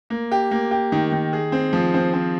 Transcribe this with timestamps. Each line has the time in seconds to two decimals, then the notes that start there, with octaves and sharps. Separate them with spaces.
0.10 A#3
0.31 G4
0.51 A#3
0.71 G4
0.92 D#3
1.12 D#3
1.33 G#4
1.52 C4
1.73 F3
1.94 C4
2.13 C4